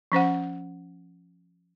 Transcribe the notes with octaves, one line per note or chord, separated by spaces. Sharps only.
F3 C#4 C5 F#5